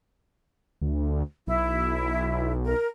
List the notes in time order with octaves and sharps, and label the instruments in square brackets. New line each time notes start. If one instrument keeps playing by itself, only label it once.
[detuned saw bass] D2
[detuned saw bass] B1 [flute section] E4
[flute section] A#4